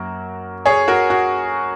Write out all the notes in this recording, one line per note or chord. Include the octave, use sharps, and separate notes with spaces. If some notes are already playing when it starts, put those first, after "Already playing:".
Already playing: F#2 F#3 A#3 F#4 A#4
G#4 C#5
F#4 A#4
F#4